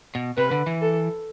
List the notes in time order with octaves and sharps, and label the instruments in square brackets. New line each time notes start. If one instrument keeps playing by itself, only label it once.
[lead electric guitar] B2
[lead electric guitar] C3 [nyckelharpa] B4
[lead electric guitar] D3
E3
[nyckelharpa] A4